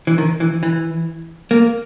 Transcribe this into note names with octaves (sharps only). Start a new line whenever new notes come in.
E3
D#3
E3
E3
A#3